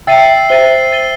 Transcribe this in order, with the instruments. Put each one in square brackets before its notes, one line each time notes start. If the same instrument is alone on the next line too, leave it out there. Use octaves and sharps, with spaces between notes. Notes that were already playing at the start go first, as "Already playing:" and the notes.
[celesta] E5 G5 [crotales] E6 A6 C7 D#7
[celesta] C5 E5 [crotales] A6 D#7 G7
[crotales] A6 D#7 G7